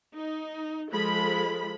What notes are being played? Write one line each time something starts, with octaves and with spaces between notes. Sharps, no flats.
D#4
F3 G#3 A4 B5